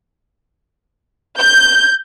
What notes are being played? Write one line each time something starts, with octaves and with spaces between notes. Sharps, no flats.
G6